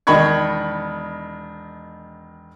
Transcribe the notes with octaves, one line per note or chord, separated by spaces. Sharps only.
E1 D#3 D#5 B5 C#6 G#6